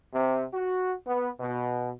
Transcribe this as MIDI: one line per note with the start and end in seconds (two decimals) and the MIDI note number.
0.14 0.44 48
0.53 0.93 66
1.07 1.29 59
1.40 1.91 47